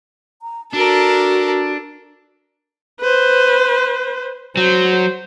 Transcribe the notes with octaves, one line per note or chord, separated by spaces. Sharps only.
A#5
D4 F#4 A4 A#4
B4 C5
F#3 C5